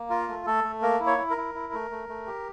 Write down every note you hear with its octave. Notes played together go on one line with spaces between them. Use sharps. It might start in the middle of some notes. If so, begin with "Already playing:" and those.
Already playing: A#3
F4 A#4
A3
A3 A4
A3
A#3 A#4
E4
C#5
E4
A#4
E4
E4
A3
A3
A3
G4